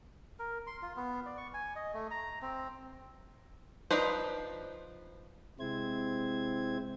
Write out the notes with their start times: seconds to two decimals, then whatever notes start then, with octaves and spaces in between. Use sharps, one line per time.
0.39 A#4
0.67 C6
0.82 F4
0.96 B3
1.26 D5
1.37 C#6
1.54 G#5
1.76 D#5
1.94 A3
2.11 A#5
2.42 C4
3.91 F3 D4 D#4 B4 C5
5.60 C3 G#3 C4 E4 C5 G#6